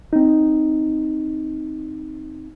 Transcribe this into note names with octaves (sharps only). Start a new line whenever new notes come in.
C4 D#4